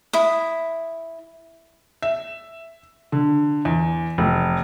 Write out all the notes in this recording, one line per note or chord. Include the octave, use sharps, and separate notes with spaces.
E4 D#6
E5
D3
E2
F1